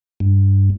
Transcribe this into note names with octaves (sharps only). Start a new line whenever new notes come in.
G2